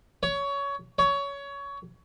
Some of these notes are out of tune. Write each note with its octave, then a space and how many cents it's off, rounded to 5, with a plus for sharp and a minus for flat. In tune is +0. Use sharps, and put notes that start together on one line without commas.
C#5 +20
C#5 +20